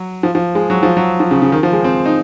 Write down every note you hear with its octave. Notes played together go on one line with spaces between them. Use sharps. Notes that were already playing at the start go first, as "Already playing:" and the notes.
Already playing: F#3
F3
F3
G#3
F#3
F3
F#3
F3
C#3
C#3
D#3
F3
G#3
C4
D#4